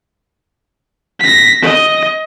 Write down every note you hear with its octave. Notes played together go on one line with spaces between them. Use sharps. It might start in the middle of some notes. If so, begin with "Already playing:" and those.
A#6 B6
D#5